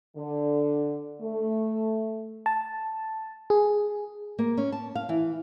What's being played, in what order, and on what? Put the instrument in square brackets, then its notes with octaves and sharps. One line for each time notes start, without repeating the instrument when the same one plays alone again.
[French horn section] D3
A3
[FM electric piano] A5
G#4
[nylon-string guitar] A#3
C#4
A5
F5
E3